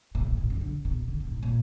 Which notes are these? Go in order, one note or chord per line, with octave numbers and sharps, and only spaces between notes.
A#2
A#2
G#2
F#2
D3
B2
D3
B2
G#2
A#2